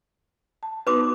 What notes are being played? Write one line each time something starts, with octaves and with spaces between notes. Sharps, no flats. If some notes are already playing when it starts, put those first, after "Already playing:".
A5
B3 D#4 F#4 B4 C6 D6